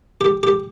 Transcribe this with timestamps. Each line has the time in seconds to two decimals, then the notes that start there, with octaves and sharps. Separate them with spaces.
0.21 G4
0.43 G4